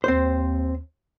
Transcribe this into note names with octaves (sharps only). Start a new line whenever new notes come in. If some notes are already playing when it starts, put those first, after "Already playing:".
D#2 C4 C5